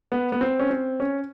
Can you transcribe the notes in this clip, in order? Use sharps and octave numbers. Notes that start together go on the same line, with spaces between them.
B3
B3
C4
C#4
C4
C#4